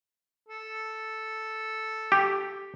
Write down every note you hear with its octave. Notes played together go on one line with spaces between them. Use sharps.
A4
G4